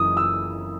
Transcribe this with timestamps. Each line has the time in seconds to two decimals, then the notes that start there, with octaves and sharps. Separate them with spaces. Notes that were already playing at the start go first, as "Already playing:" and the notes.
Already playing: F#1 F#2 C#3 E3 D#6
0.17 E6